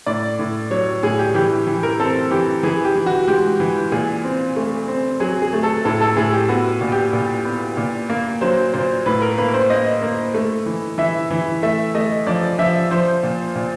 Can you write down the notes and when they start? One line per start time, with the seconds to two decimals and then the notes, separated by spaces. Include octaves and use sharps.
0.06 A2 D5
0.39 A2
0.71 F#3 C#5
1.03 A2 G#4
1.19 G4
1.35 E3 G4
1.67 E3
1.83 A#4
2.00 C4 A4
2.31 E3 G4
2.63 E3 G#4
2.85 G4
2.96 E3
3.06 F#4
3.27 G#3 G4
3.60 E3
3.92 A#2 G#4
4.24 C4
4.56 A3
4.88 C4
5.20 F#3 G#4
5.42 G#4
5.53 A3
5.63 A4
5.85 A2 A4
6.01 A4
6.16 A2 G#4
6.33 G4
6.49 B3 F#4
6.81 A#2
6.92 G4
7.13 A#2
7.45 B3
7.77 A#2
8.10 A#3
8.41 F#3 C5
8.74 A#2 C5
9.06 A2 B4
9.22 A#4
9.38 A#3 B4
9.54 C5
9.70 A#3 D#5
10.02 A#3
10.34 A3
10.66 E3
10.98 E3 E5
11.31 E3
11.62 A3 E5
11.94 A3 D#5
12.27 F3 D5
12.59 F3 E5
12.91 F3 C5
13.23 A#2
13.56 A#2